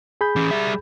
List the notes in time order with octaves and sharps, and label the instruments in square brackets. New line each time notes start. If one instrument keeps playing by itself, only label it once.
[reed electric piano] G#4 B5 G6
[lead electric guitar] E3 C#4
G3 E5